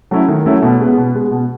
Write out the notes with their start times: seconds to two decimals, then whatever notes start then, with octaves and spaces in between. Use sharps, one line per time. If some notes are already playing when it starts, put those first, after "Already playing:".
0.11 F#3 A3 C#4 E4
0.28 D#3
0.46 F#3 A3 C#4 E4
0.62 B2
0.81 G#3 B3
0.97 B2
1.15 G#3 B3
1.31 B2